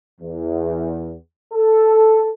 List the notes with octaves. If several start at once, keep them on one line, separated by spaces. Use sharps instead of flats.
E2
A4